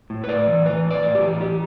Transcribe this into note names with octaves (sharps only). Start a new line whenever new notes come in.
A2
B4
A2 D5
E3
E3 B4
A2
D5
A2
G4
E3
E3 G4